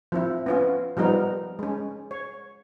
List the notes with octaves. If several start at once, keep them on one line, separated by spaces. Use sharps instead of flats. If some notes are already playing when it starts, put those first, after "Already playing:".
F3 C4 E4
B3 C#4 F4
F3 G3 B3 D#4 A#4
G#3 C#4
C#5